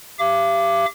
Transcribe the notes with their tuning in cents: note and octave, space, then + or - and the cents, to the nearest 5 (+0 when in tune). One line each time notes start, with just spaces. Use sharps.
G4 +0 F5 -45 D6 +0